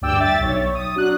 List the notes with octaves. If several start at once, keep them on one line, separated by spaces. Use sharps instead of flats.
D2 G2 D5 G5 E6
E5 A6
B1 C#5
D#6
F#3 D4 F#6